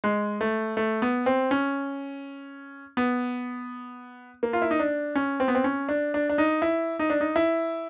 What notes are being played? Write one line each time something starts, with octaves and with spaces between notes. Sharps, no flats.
G#3
A3
A3
B3
C4
C#4
B3
A#3
F4
E4
D#4
D4
C#4
C4
B3
C4
C#4
D4
D4
D4
D#4
E4
D#4
D4
D#4
E4